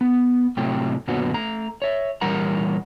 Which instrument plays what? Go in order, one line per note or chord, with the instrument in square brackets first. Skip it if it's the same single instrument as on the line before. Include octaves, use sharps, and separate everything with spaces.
[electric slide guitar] B3
A2 C3 F#3 A3 G5
F#2 A#2 D3 F#3 B3 F#4
A3 A#5
C#5 E5
A#2 E3 G3 A#4 F#5 A#5